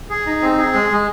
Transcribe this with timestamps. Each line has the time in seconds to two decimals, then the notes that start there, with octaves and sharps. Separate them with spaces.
0.10 G#4
0.26 D#4
0.42 C4
0.58 G#4
0.74 G#3
0.90 G#3